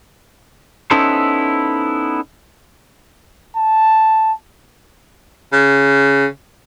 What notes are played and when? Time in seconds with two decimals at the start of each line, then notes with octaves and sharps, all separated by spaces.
0.91 B3 C#4 D#4 E4 A4 C5
3.56 A5
5.53 C#3